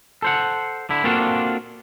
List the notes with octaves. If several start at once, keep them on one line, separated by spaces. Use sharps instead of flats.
A4 C5 F#5
D3 E4
A#3 C4 D4 F4 F#4 A4